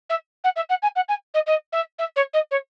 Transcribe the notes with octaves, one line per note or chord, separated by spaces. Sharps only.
E5
F#5
E5
F#5
G#5
F#5
G#5
D#5
D#5
E5
E5
C#5
D#5
C#5